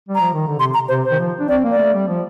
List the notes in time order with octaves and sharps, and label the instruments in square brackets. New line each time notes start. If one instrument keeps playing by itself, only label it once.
[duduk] G3
[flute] A#5
[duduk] F3
D#3
D3
[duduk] C3 [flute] C6
[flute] A#5
[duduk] C3 [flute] C5
[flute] C5
[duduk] D#3
F3
D4
[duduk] C4 [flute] D5
[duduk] A#3
[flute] D5
[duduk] A3
G3
F3